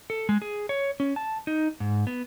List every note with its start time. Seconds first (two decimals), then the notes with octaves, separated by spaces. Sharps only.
0.10 A4
0.29 G#3
0.42 G#4
0.69 C#5
1.00 C#4
1.16 A5
1.47 D#4
1.80 G#2
2.07 B3